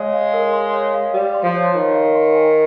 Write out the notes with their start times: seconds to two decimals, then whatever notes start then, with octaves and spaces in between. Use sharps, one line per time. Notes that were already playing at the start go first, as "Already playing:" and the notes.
Already playing: G#3 C#5 F5
0.13 F5
0.34 A#4
0.53 C6
0.74 C#5
0.94 F5
1.14 G3 F5
1.34 C6
1.44 F3
1.54 C#5
1.74 D#3 C#5
1.94 F5
2.15 C6
2.35 G#5